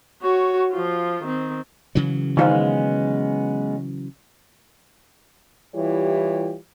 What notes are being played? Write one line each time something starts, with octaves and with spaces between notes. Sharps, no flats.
F#4 C#5
F3 F4
D#3 C4
C#3 E3 F#3
D#3 G#3 B3 C#4 F4 C5
E3 G3 E4 F4 G4 C#5